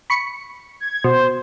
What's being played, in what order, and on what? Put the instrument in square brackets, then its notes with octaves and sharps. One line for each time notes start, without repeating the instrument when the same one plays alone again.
[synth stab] B5 C#6 C#7
[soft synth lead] G#6
[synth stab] B2 [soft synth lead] C5